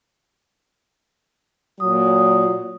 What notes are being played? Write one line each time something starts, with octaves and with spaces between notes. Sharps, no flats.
A#2 F#3 D#6